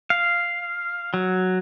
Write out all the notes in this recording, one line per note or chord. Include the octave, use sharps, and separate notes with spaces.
F5
F#3